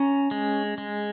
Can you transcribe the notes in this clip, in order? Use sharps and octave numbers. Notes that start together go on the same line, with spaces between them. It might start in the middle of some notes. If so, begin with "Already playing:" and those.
Already playing: C#4 A#5
G#3
G#3